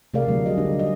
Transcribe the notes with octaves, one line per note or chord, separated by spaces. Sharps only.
C3 A3 G#4 A#4 D5 F5
D3 F#3 A3 E4
G3 F#4 G#4 D#5
D3 G3 D4 D#4 G4
D#5